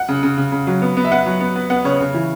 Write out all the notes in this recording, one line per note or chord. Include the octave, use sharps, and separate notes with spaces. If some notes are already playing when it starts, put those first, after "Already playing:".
Already playing: F#5
C#3
C#3
C#3
C#3
F#3
B3
B3
E5
B3 F#5
F#3
B3
B3
B3 F#5
C#3 C#5
C#3
E3